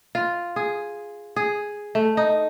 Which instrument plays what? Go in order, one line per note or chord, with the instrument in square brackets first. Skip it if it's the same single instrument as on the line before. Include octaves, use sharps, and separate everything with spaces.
[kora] F4
G#4
G#4
A3
D#4